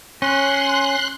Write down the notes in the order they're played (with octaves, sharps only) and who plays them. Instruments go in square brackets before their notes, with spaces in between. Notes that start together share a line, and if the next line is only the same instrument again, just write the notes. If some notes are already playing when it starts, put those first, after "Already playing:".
[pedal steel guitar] C#4 [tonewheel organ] C6 F#6